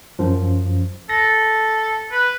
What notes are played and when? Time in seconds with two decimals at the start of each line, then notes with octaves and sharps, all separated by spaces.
0.19 F#2 F3
1.09 A4 A#6
2.12 B4